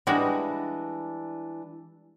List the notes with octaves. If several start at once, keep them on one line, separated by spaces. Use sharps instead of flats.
E3 G3 G#3 D4 F#4